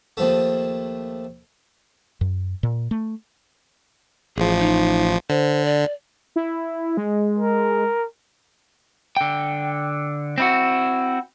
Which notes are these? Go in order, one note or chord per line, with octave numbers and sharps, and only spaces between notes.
D#2 F3 A3
F#2
A#2
A3
A1 F3 G#4
D#4
D3 C5
D5
E4
G#3
A#4
D3 G5
C4 E4 F#4